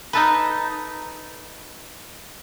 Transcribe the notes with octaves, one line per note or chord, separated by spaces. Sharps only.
D#4 A4 B4